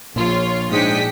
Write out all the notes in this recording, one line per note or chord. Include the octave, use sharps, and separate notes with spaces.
A#1 A#2 F3 F4 C#5
G#2 G#3 D4 G5 D#6 B6 C#7